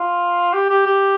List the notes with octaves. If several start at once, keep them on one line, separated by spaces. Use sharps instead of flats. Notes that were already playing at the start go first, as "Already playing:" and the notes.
Already playing: F4
G4
G4
G4